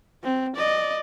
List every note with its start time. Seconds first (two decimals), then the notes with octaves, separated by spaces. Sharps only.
0.23 C4
0.56 D5 D#5